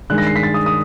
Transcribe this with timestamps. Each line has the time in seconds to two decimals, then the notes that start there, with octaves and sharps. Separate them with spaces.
0.10 G2 D#3 G#3 F#6
0.18 A#6
0.27 C7
0.36 B6
0.43 A6
0.54 D#6
0.66 D#6